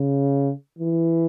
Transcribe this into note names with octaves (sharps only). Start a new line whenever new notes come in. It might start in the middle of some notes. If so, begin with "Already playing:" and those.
Already playing: C#3
E3